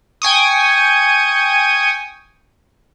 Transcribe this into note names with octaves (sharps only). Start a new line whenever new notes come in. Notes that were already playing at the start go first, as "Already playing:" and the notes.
G5 G#5 C#6 D#6